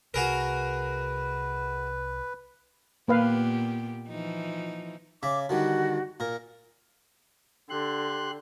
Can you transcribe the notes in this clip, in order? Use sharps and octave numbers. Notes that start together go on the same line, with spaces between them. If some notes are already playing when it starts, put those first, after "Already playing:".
C2 C3 F#4 G#4 A#4 B4
A#2 A#3 B3 G4 B4 F5
E3 F3 D#4
C#3 E5 D6
D3 D#3 G3 F#4
A#2 A#4
D3 G4 C6 F#6